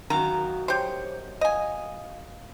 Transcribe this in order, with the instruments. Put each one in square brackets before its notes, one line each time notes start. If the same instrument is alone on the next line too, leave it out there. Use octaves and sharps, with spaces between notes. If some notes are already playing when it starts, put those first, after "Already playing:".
[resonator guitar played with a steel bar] F#2 D#3 A#5 [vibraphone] F#4 F5
[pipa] G4 C5 [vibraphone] C#5
[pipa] D#5 G#5 [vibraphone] F5